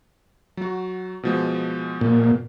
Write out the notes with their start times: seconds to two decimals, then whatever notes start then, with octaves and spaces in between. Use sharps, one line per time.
0.57 F#3 F#4
1.23 B2 F3 G#3
2.01 A#2